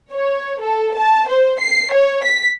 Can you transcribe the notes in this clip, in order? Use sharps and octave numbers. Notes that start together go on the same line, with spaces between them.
C#5
A4
A5
C5
C7
C#5
B6